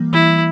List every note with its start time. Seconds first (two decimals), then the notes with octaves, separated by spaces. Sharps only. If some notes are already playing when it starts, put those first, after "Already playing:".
Already playing: E3 G3 A#3
0.13 E3 E4